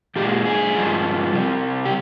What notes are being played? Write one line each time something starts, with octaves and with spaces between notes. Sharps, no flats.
A#2 G#3 G4
G#4
G2 F3 G#3
C3 G3
G4